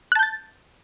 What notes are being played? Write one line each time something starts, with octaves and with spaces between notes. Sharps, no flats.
A5 F#6 G6 A6